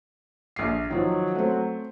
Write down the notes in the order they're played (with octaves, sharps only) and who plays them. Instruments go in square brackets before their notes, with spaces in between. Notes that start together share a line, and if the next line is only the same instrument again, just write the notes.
[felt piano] A#1 C7
[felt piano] D#3 F3 [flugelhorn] F#3
[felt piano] A3 C4